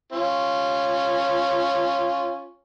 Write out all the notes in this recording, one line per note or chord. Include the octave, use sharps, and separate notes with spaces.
C#4 F4